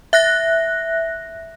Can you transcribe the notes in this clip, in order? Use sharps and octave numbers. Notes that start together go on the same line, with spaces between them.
E5 F#6 A#6